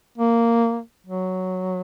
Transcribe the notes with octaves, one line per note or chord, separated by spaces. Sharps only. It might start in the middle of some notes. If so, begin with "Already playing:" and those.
A#3
F#3